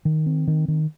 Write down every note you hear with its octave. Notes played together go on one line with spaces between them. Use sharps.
D#3
C4
D#3
D#3